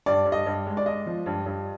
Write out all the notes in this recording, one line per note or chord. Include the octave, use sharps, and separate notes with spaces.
G2 D5
G2
D#5
G2
G#3
D5
G#3 D#5
F3
G2
G2